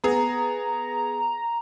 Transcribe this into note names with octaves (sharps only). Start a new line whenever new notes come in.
B3 G#4 A#5